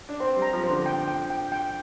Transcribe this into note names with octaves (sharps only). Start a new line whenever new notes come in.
D4
C4 C5
G3
A#5
F3
C5
D3
G5
G5
G5
G5